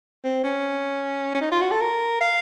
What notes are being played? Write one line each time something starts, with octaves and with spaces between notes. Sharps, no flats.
C4
C#4
C#4
D#4
F4
F#4
A4
A#4
F5